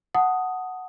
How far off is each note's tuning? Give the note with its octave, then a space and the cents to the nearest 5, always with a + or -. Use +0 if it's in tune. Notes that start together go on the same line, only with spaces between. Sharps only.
F#5 +0 A5 +0 D#6 +0